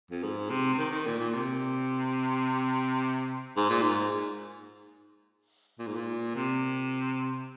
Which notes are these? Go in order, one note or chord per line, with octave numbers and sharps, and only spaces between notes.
F2
G#2
C3
C3
D#3
D#3
A#2
A#2
C3
G#2
A#2
G#2
A#2
G#2
A#2
C3